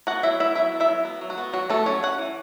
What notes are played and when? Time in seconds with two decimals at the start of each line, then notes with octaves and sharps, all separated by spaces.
0.07 B3 F#4 F#5
0.23 F#3 E4 E5
0.40 B3 E4 E5
0.55 F#3 E4 E5
0.72 B3
0.80 E4 E5
0.88 F#3
1.05 B3
1.21 F#3
1.30 F#4
1.38 B3
1.53 F#3 F#4
1.70 A3 B3 A4
1.86 F#3 C#4 C#5
2.03 C#4 F#5
2.18 E3